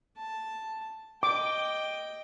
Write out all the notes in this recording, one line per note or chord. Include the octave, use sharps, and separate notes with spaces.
A5
D#5 G5 D6